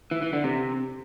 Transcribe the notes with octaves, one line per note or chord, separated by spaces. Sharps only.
E3
E3
D3
C3